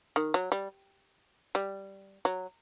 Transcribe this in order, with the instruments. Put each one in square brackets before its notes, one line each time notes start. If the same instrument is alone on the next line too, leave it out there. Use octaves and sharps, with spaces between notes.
[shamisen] D#3
F#3
G3
G3
F#3